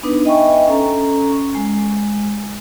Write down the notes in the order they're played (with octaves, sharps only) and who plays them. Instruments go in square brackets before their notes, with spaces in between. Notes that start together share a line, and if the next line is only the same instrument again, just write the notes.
[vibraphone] B3 D4 D#4 B4
D#5 E5 G5 G#5 B5 C#6
C#4 A4 A#5 C#6
G#3